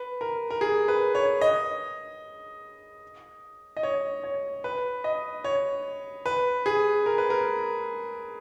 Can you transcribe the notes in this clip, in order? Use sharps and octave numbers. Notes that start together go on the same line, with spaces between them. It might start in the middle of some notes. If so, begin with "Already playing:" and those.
Already playing: B4
A#4
A#4
G#4
B4
C#5
D#5
D#5
C#5
C#5
B4
D#5
C#5
B4
G#4
A#4
B4
A#4